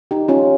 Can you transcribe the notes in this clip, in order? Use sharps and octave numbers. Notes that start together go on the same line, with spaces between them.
D#4 G4
C#4 F4